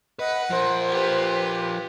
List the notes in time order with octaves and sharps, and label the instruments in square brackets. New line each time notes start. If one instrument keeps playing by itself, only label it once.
[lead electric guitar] B4 [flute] D#5 [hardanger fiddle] F#5
[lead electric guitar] F3 A#4 [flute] C5
[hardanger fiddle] G4 B4